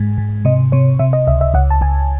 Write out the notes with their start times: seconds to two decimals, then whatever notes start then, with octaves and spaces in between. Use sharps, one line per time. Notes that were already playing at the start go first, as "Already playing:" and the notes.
Already playing: G#2 G#3
0.18 G#2
0.45 C3 D#5
0.72 C3 C#5
0.99 C3 E5
1.13 D#5
1.27 C#2 E5
1.41 E5
1.54 C#2 F#5
1.71 A5
1.81 C#2 G#5